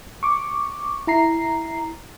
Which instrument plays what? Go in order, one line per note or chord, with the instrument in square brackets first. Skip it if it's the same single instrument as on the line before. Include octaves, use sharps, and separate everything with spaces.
[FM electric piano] C#6 D6
E4 A#5 C7